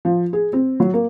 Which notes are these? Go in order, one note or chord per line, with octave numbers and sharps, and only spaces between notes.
F3
G#4
C4
F#3
A#3